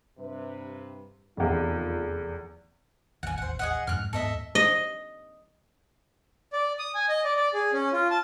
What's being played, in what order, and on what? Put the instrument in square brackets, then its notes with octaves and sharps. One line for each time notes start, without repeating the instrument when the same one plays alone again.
[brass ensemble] G2 C3 B4
[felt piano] F1 E2 [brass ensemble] D#3 E3 F4
[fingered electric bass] E1 A1 D#2 [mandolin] F#5 G#5
[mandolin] C5 F#5
G#4 D#5 F#5
[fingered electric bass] F2 G#2 [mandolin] F6 F#6
[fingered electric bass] D#2 G#2 B3 [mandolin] A4 D#5 E5
[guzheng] D#5
[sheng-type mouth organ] D5
D#6
G#5
D#5
D5
D5
G#4
C#4
F4
A5